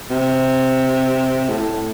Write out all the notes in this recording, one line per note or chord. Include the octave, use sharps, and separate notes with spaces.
C3
A2